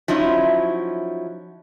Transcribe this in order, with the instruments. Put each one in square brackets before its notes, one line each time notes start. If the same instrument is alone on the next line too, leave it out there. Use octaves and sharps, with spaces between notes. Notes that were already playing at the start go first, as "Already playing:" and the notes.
[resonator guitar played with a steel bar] F3 F#3 C#4 D#4 E4